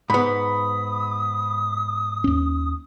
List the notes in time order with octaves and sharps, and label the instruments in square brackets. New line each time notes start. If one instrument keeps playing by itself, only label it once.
[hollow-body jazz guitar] G#2 B3 [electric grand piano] B5 [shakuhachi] D#6
[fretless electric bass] D#2 C#4